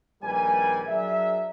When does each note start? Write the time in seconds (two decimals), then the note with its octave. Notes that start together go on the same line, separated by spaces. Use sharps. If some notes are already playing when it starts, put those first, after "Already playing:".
0.22 A#1 D#3 G3 A#4 B4 G#5
0.87 F#3 D4 G#4 A#4 E5